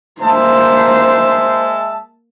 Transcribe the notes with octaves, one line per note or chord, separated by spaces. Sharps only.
G#3 A#3 C5 E5 A5